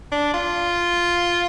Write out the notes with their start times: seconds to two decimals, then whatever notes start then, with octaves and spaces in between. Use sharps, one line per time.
0.12 D4
0.34 F4